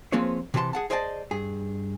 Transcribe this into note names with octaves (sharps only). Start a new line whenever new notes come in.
F3 A#3 C4 G#4 B4 C#5
C3 E3 G#4 C5 A5 C6
G#4 F#5 A5
G#4 C5 D5 D#5 G5 A5
G2 G#4